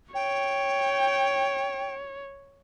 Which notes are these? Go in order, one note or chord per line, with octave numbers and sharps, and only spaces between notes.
C#5 G5